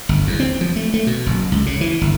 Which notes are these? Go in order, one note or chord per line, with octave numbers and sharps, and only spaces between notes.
G1
E2
C4
F3
A3
A3
B2
F#1
C#2
C#3
E3
G1